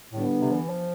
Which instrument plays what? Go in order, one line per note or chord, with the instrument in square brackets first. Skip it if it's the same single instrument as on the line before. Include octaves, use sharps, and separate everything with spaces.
[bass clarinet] A2 [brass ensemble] D3 G3 B3 D4
[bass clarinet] C3
F3
E3
F3